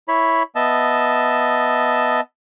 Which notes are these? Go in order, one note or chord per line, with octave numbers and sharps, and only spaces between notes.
E4 C#5 B5
B3 D#5 E5 A5